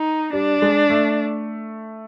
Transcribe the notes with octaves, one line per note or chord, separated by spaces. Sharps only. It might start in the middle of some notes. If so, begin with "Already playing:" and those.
Already playing: D#4
G3 D4
G#3
A3